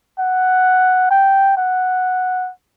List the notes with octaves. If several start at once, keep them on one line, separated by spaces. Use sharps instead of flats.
F#5
G5
F#5